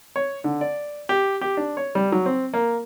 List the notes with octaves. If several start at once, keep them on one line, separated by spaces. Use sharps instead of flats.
C#5
D3
D5
G4
G4
D4
C#5
G3
F#3
C4
A#3